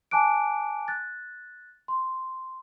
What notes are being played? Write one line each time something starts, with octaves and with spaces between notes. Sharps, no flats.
G#5 A5 D6 F#6 D7
F#6 A6
C6